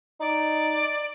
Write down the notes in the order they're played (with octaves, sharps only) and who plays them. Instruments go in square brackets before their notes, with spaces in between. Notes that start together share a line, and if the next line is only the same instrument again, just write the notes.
[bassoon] D#4 [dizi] D5